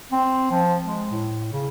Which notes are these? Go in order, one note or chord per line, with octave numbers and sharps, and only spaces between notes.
C4
F3
G#3
A2
C#3